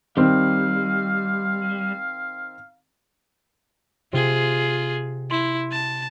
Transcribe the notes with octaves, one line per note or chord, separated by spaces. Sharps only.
D#3 G3 C4 F5
C3 F4 G#4
E4 C6
A5